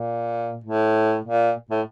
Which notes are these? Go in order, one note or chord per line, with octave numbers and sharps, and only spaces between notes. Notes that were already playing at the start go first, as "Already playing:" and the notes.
Already playing: A#2
A2
A#2
A2